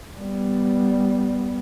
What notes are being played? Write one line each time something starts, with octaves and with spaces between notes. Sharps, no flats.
G3 B3